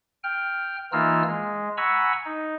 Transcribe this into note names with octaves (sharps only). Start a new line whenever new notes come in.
G5 F6
E3 A#3 D#4 F4 E6 F6
G#3
F#5 G#5 A#5 B5 C#6 E6
D#4